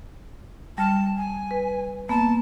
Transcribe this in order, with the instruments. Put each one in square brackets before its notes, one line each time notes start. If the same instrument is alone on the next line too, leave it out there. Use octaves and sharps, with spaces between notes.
[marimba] G3 F6 [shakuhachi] A5
[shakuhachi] G#5
[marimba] B4
[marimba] A#3 B3 [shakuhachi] A5